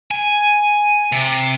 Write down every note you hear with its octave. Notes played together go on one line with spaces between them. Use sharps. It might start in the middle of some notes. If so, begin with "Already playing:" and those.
G#5
C3